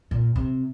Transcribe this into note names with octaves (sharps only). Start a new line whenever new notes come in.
A#2
C3